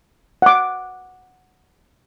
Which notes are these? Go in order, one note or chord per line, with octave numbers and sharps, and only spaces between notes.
F#5 D6